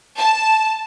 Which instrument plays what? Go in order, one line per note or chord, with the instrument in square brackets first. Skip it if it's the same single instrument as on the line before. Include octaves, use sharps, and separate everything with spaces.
[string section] A5